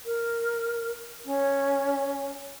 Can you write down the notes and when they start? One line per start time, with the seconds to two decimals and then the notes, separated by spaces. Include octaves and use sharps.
0.05 A#4
1.25 C#4